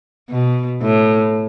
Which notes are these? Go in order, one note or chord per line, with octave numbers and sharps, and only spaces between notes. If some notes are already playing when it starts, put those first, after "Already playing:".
B2
A2